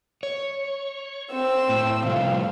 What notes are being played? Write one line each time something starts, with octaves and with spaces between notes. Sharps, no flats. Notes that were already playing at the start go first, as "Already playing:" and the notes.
C#5
C4 E6
A2
C3 F3 G3 F5